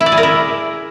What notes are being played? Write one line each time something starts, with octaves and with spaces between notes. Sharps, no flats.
E4
D5
G#4
A#4
E4